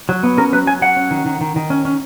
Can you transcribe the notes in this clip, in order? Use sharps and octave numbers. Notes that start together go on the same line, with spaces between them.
F#3
B3
C#4 A#4
F#3 B4
F#3 G#5
F#3 F#5
C#4
D#3
D#3
D#3
D#3
C#4
C#4